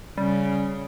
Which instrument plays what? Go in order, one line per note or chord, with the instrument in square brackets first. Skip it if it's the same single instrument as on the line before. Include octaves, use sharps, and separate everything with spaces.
[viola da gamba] C#3 [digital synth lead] G3 [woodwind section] C#4